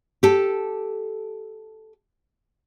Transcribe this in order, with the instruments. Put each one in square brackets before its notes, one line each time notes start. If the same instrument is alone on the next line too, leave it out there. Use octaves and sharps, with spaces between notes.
[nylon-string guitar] G4 A4